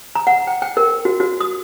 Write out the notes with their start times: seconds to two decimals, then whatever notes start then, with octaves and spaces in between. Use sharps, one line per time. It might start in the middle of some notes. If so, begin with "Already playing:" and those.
0.15 A#5
0.27 F#5
0.47 G5
0.62 G5
0.77 A#4
1.05 F#4
1.20 F#4
1.40 D#6